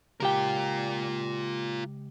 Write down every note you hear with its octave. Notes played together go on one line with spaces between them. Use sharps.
C#2 F4 G4 A#4 G5